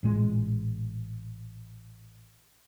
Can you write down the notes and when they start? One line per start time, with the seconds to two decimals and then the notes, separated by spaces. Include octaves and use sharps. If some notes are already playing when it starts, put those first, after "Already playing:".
0.03 A1 A#2 G#3